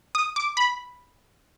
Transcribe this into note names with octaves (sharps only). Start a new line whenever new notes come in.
D#6
D6
B5